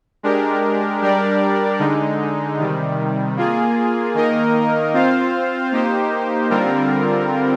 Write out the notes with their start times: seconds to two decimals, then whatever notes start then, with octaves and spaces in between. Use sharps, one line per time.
0.23 G#3 D4 G4 A#4
1.02 G3 D4 G4 A#4 D5
1.79 D3 G#3 D#4
2.58 C3 D#3 G3
3.37 A#3 F4 G#4
4.14 D#3 A#3 D#4 A#4 D#5
4.93 C4 F4 C5 F5
5.72 A#3 D#4 G4 C5
6.50 D3 G3 C4 F4 A#4